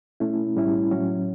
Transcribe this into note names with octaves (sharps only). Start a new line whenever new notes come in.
B2 A3 C#4 E4
A2 G3 C#4 E4
A2 F#3 C#4 F#4